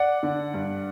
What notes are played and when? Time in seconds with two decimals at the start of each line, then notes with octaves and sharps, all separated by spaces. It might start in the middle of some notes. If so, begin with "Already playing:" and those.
Already playing: D5 F#5
0.23 D3
0.54 G2